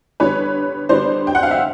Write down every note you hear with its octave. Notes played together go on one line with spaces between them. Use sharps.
D3 G3 B3 B4 C#5
D3 G3 B3 C5 D5
G5
F#5
F5
E5